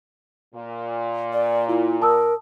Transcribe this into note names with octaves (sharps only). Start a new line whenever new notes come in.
A#2
D5
E4 F4
A#4 A5 D#6 E6